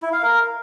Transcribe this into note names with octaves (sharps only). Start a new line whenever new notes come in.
E4
F5
A#4